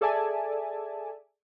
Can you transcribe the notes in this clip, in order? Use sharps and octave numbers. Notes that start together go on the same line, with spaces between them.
G#4 A4 D5 E5 G#5 A5